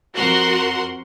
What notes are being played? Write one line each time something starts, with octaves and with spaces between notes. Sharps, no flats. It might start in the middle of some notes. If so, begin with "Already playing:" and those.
F2 F#4 A#4 F#5 C6